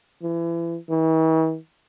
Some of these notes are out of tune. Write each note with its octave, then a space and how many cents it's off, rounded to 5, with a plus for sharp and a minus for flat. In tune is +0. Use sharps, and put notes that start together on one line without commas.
E3 +30
E3 -45